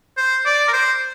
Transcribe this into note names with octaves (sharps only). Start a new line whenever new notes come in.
C5
D5
A#4
C5